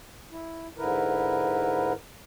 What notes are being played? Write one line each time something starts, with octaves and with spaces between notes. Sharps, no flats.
E4
G#2 D3 E4 A#4 B4